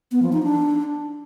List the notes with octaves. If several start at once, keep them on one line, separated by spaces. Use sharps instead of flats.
B3
F3
D#4
D4